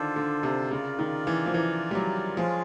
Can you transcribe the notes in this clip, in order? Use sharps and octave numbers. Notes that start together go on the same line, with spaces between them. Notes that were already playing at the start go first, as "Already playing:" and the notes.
Already playing: D3 D#3 D4 F4 A4 C5
D3
C3
C#3 F4 A#4 D5
D#3
E3
F3
E3
G3
F#3
F3 G#3 C#4 F4 G#4